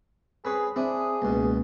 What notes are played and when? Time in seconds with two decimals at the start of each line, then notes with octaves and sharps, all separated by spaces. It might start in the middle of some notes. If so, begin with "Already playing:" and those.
0.45 C4 G#4 B4 C#5 B5
0.76 C4 D4 E4 G#4 C5 D#6
1.22 C#2 B2 A#3